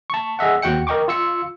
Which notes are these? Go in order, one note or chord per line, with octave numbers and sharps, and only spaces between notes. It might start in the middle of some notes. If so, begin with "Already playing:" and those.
A5 C#6
G#4 D#5 E5 F#5
D#2 F#4 F#5 G5 C#7
A#4 D#5 G5 C#6 D6
F4 E6 C#7